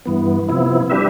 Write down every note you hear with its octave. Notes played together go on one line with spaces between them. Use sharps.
G2 E3 B3
C3 F3 B3 E4
G3 D4 G4 B4 E5